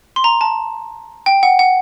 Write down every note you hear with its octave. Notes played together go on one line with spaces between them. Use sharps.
C6
A#5
A5
G5
F#5
F#5